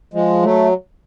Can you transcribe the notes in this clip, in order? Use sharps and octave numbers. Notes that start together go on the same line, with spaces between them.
F3 G#3
F#3 A3